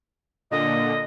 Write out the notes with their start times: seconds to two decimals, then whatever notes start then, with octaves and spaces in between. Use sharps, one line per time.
0.51 A#2 D3 D#5